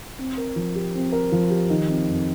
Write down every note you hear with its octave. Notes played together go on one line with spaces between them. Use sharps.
C4
A#4
F3
G4
C4
A#4
F3
G4
D#3
C4
F2